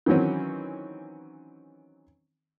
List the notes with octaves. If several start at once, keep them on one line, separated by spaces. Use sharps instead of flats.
D#3 E3 F#3 C4 C#4